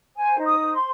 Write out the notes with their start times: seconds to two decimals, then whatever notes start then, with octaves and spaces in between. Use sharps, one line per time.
0.16 C5 G#5
0.39 D#4
0.45 D#6
0.61 C5
0.74 C6